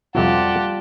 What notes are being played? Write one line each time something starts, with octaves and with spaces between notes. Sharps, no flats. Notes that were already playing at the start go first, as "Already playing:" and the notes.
F2 C3 F#3 G3 F4 G4 F#5 A5